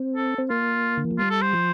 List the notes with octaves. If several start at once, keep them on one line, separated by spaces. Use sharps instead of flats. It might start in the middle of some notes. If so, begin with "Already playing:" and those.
Already playing: C4
A4
C4
A#3 F4
D3
E3
F3
G3 F4
A4
C5
F3